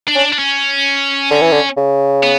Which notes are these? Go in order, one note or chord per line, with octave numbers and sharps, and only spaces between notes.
D4
C#4
D4
C#4
D3
E3
D3
C#3
B3